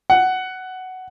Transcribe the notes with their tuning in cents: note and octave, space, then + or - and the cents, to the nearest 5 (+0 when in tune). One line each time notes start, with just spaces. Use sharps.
F#5 +10